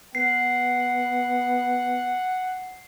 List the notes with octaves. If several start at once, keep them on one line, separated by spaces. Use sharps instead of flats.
B3 F#5 C7